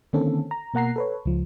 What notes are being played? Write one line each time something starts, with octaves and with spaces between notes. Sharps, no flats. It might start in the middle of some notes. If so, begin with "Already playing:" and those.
D3 D#3 A#3 C4 C#4 A4
A#5
B2 A#3 F#5 A#5 C7
A4 B4 C#5
C#2 F3